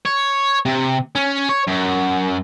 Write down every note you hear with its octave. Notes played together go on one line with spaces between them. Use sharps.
C#5
C3
C#4
C#5
F#2